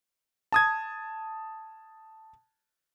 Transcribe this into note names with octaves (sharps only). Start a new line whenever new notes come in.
A5 D#6 G#6